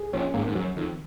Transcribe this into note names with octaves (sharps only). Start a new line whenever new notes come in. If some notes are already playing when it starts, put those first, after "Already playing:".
Already playing: G#4
A#1 A#2 C#4
G#1 G#2 A#3
G#2
F#2 F#3
F2 D#3